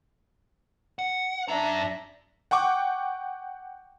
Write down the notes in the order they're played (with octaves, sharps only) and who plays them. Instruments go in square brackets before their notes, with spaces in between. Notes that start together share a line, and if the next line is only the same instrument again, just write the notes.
[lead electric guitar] F#5
[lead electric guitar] F#2 A#5 [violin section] D4 E5 A#6
[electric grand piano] F#5 G5 C#6 D6